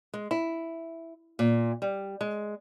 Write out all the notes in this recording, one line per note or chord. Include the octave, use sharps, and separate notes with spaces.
G#3
E4
A#2
G3
G#3